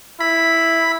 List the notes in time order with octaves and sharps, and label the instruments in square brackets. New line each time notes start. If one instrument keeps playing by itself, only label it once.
[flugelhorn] E4 [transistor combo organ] B5